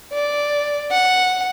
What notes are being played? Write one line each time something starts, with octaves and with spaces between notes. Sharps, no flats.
D5
F#5